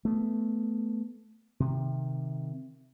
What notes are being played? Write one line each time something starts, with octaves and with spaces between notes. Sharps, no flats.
A3 B3
C3 D#3